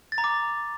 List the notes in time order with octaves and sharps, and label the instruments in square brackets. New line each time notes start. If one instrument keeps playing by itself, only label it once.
[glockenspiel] A6
A#5
D6